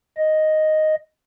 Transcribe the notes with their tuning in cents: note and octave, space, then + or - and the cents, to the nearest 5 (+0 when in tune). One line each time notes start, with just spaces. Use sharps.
D#5 +0